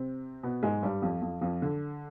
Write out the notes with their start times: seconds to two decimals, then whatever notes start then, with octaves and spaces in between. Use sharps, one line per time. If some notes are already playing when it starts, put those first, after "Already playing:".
Already playing: C3 C4
0.43 B2 B3
0.63 G#2 G#3
0.82 G2 G3
1.02 F2 F3
1.22 F2 F3
1.41 F2 F3
1.62 D3